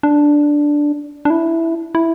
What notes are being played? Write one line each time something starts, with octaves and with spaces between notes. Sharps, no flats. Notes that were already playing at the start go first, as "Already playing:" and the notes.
D4
D4
E4
E4